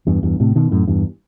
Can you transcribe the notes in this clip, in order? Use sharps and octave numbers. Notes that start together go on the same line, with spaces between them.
E2 G2
E2 G2
A2 C3
B2 D#3
F#2 A2
E2 G2